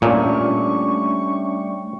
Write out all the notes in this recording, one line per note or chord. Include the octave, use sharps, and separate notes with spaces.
A#2 G3 A3 C#4 D4 C#6